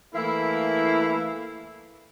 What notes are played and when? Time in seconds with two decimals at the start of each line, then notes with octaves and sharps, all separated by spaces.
0.14 E3 A3 A#3 E4